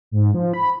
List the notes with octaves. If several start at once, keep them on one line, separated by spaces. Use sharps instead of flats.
G#2
F3
B5